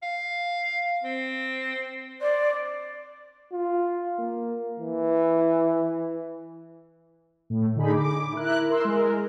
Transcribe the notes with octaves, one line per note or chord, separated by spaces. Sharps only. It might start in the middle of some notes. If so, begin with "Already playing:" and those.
F5
C4
C5 D5
F4
A#3
E3
A2
D3 D#4 G#4 B5
D6
E4 A#4 F#6
A#4 C6 E6
G#3 A#4